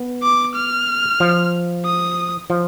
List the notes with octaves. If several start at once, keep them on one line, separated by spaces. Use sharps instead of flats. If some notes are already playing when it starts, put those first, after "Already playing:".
Already playing: B3
D6
F6
F3
D#6
F3